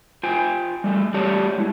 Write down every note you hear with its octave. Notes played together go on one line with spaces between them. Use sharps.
F4 C5 G5 G#5
G3 A3
G3 A3 G4 C#5 D5 A5
G#3 E4